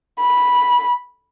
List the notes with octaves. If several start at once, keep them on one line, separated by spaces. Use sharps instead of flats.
B5